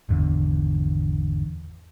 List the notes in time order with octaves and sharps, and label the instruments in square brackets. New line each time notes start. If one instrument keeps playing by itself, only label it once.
[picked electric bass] G#1 E2 D3